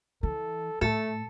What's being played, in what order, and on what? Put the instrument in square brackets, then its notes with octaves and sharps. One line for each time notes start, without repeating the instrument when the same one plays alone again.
[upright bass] E3 [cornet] A4
[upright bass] A2 [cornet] A3 [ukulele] A4